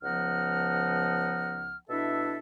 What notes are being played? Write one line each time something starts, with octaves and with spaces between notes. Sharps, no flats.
C#2 F3 B3 D#4 F#5 F6
B2 D4 E4 A4 E5